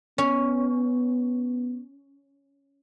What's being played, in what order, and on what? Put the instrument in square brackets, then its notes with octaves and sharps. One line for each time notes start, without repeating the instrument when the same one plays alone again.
[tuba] B3 [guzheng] C#4